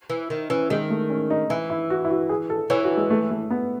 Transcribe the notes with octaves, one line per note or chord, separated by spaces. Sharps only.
E3
D#3
E3 C#4
D#3 G#3
A3
C#4
D#4
E3 E4
E4
F#4
E4
F#4
G#4
A4
E3 C#5
F#4
G#3
A3
A3
B3